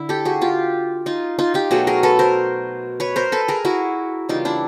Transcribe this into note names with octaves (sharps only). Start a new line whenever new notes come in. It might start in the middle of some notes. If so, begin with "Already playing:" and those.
Already playing: D3 E4
G4 A4
F#4 G#4
F4 G4
D#4 F4
D#4 F4
F4 G4
B2 F#3 A3 F#4 G#4
G#4 A#4
A4 B4
A#4 C5
B4 C#5
A#4 C5
A4 B4
G#4 A#4
E4 F#4
C#3 E3 G3 A#3 D#4 F4
D4 E4